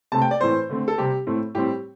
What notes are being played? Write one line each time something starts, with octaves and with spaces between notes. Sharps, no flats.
C3 A3 C4 A5
G5
D5
A2 E3 A3 C4 C5
D3 A3 C4
A4
C3 G3 C4 G4
A2 A3 C4
A2 G3 C4 G4